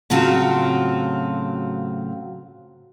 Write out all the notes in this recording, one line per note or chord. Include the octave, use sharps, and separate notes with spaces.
A2 C#3 F#3 C4 F4 F#4